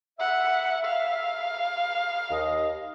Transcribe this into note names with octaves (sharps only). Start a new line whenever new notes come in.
E5 F#5
F5
D#2 D#5